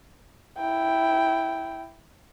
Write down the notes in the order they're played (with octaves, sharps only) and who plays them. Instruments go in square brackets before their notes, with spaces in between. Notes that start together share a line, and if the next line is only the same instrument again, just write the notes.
[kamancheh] E4 G5